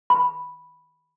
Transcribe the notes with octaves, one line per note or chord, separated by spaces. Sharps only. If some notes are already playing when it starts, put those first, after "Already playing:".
B5